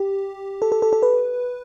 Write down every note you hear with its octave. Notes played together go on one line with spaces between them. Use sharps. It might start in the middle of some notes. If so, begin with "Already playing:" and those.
Already playing: G4
A4
A4
A4
A4
B4